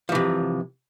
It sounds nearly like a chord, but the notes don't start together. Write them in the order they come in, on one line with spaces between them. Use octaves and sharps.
F3 E3 C3